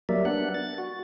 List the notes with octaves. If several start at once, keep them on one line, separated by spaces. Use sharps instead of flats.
F#3 G3 A#3 A#4 D5 E5
B3 D4 F#5 F#6
A6
F#4